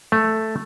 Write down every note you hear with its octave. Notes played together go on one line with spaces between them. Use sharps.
A3